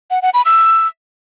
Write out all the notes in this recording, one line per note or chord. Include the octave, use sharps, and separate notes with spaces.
F#5
F#5
B5
E6